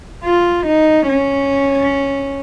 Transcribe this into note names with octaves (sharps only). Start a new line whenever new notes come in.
F4
D#4
C#4